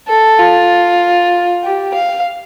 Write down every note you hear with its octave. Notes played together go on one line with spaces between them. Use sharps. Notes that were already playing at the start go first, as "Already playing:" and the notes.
A4
F4
G4
F5